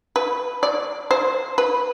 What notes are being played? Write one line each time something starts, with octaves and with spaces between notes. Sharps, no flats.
B4
D5
C5
B4